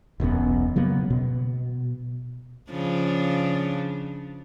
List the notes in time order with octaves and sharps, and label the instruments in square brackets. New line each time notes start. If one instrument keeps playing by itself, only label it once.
[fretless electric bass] E1 B1 F#2 B3
C#3 F#3 A#3 B3
B2
[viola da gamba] C#3 F3 D4